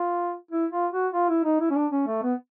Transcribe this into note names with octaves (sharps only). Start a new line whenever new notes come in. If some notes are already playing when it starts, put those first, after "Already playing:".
Already playing: F4
E4
F4
F#4
F4
E4
D#4
E4
C#4
D4
C#4
A3
B3